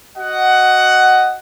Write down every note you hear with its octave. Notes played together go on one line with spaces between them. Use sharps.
F#4 D#5 F#5